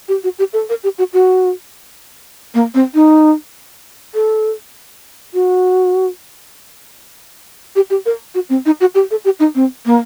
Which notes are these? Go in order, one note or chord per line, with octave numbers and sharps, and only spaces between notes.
G4
F#4
G4
A4
A#4
G4
F#4
F#4
A#3
C4
D#4
A4
F#4
G4
G4
A#4
F#4
C4
D#4
F#4
G4
A4
G4
D#4
C4
A#3